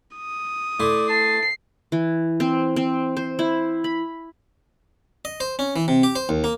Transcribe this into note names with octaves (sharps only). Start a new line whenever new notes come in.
D#6
A3 E4 D5 C6
A5 C7
E3
C4
C4
C5
E4
B5
D#5
C5
C#4
E3
C3
G4
C5
D#2
A#3